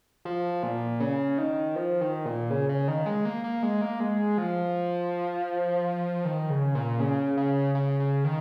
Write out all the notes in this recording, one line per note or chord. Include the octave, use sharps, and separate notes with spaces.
F3
A#2
C#3
D#3
F3
D#3
A#2
C#3
C#3
D#3
G#3
A#3
A#3
G#3
A#3
G#3
F3
D#3
C#3
A#2
C#3
C#3
C#3
C#3
D#3